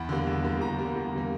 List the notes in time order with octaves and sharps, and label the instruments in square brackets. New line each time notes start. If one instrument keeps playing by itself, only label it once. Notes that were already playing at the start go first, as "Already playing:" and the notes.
Already playing: [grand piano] E2 B5
D3 G3 A#3
E2
D3 G3 A#3
E2 A#5
D3 G3 A#3
E2
D3 G3 A#3